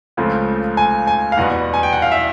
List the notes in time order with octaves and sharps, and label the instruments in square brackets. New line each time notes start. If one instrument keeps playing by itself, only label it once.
[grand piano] C#2 C#3 F3 A3 C4
G#5
G#5
F5
E2 B2 G3 B3 F#5
G#5
G5
F#5
F5
E5